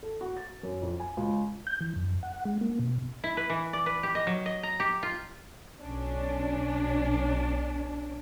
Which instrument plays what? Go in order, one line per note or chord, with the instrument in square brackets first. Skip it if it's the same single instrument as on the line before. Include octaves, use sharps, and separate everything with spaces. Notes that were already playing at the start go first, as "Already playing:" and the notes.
[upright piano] A4
F#4
A6
F#2
F2
G#5
C#2
[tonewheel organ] G6
E3
F#2
F#5
G#3
A#3
B2
[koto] E4
B4
E3
D5
B4
G4
D#5
F#3
D#5
A#5
G4
F4
[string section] B1 C#4 D4